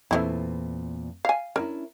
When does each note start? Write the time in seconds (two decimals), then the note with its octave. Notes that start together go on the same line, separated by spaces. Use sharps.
0.11 E2 A#2 A3 C4 D#4 E4
1.25 F5 G#5
1.56 C#4 D4 E4 A#4